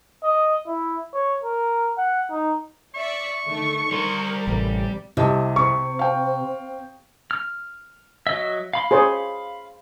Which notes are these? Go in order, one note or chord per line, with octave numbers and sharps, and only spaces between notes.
D#5
E4
C#5
A#4
F#5
D#4
D5 E5 C#6
D3 D#3 A3
G3 A#4 C5 C6
A1 C3
C2 C3 D#5 A5
C4 C#6
F5 G5
F6
F#3 D#5 E5
F5 B5 C6
G#4 C5 C#5